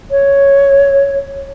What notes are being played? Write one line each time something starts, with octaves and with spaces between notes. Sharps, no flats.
C#5